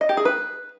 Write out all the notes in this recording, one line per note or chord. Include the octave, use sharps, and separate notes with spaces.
D#5
G4
G#4
B4